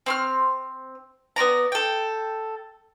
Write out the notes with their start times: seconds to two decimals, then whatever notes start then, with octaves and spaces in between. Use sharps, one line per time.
0.06 C4 C6 F6
1.36 B3 C#4 D5 A#5
1.72 A4 G5